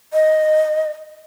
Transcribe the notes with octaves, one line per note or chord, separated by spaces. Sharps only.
D#5